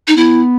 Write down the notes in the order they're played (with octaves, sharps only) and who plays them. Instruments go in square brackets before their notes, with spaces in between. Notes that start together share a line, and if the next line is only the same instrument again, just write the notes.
[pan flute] D#4
[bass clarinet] B3 [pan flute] E4